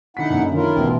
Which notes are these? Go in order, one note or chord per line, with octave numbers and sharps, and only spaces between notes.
D3 D#4 E4 F#5 B6
F#2 D3 A#3
D3 D#3 C#4 E4 F4 A#4
A1 B2